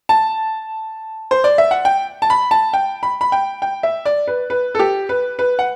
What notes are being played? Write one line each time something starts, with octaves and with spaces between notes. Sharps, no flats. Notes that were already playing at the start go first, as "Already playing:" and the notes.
A5
C5
D5
E5
F#5
G5
A5
B5
A5
G5
B5
B5
G5
G5
E5
D5
B4
B4
A4
G4
B4
B4
F#5